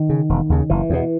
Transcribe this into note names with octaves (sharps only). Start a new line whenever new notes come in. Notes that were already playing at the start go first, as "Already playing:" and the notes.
Already playing: D#3
C#3
E1
D#2 C#3
F#1 E3
E2 B2